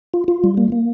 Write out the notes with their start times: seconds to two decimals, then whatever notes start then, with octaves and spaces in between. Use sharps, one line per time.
0.14 F4
0.28 F4
0.44 G3
0.57 A#3
0.72 A#3